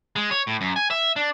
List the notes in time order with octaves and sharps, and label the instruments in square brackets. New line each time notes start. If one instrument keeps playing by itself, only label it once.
[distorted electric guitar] G#3
C#5
A2
F#2
G#5
E5
D4